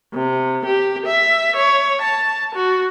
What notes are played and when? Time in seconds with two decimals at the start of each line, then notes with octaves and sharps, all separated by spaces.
0.13 C3
0.65 G4
1.07 E5
1.57 C#5
2.01 A5
2.54 F#4